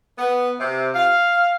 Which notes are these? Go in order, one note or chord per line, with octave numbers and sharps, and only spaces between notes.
B3
C3
F5